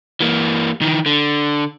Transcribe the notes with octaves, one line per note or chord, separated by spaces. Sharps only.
E3 A#3
D#3 E3
D3